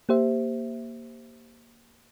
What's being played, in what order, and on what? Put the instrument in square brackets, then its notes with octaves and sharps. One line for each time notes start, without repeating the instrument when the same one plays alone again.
[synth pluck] A#3 G4 C5 E5